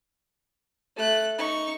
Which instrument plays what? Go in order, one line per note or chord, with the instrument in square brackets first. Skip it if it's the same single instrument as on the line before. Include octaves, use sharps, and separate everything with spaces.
[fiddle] A3 F#6
D#4 C#6